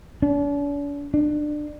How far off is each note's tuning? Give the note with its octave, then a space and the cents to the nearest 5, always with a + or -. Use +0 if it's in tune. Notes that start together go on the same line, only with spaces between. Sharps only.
D4 -45
D4 +25